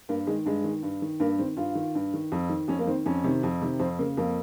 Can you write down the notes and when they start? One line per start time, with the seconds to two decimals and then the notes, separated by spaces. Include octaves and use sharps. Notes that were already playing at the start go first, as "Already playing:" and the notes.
0.09 G2 A#3
0.27 D#3 G#3
0.46 G2 G#3
0.64 D#3
0.83 G2
1.02 D#3
1.20 G2 A#3
1.39 D#3 C4
1.57 G2 F4
1.75 D#3
1.95 G2
2.14 D#3
2.32 F2
2.49 D#3
2.68 F2 C#4
2.79 A#3
2.87 D#3 C4
3.06 F2 C#4
3.24 C3 D#3
3.43 F2
3.62 C3 D#3
3.79 F2 C4
3.99 C#3 A#3
4.17 F2 A#3